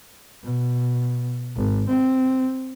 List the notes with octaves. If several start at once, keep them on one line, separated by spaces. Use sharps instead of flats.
B2
G#1
C4